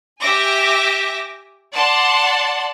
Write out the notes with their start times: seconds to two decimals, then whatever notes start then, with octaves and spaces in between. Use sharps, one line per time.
0.19 G4 E5 G#5 D6 A#6
1.72 D5 F#5 A5 C6